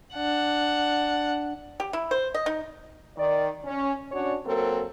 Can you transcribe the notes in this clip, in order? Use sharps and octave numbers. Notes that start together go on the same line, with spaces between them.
D4 F#5
G4
E4
C5
D#5
D#4
D#3 D5
C#4
C#4 D4 F#4 C#5 D5
F#3 A#3 C4 A4 A#4